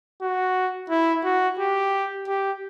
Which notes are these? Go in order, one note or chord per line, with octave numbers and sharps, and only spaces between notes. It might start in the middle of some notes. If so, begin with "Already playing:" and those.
F#4
E4
F#4
G4
G4